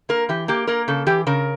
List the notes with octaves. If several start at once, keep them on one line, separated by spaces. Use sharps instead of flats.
A#3 A#4
E3 G4
A#3 G4
A#3 A#4
C#3 A4
E3 G4
C#3 A#4